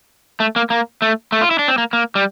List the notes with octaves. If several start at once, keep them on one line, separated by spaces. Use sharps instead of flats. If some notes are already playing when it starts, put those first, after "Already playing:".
A3
A#3
A#3
A3
A3
F4
E4
D4
C4
A#3
A#3
G3